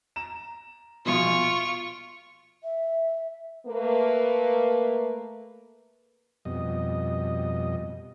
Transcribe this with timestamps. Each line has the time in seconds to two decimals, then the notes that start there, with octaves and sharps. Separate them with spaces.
0.16 A#5 E7
1.05 A#1 B2 F4 C#6
1.43 D7
2.64 E5
3.67 A3 A#3 B4
6.45 F2 B2 G3 D#5